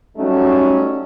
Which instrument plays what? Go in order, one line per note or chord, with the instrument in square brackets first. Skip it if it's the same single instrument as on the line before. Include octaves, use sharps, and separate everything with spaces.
[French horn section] F#3 G3 A3 C#4 D#4 F#4